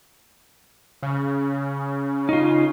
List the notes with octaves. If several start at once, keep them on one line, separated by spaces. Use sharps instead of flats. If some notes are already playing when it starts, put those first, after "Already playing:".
C#3
D#4 F4